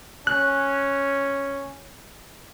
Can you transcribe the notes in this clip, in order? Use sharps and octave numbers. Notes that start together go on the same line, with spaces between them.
C#4 F#6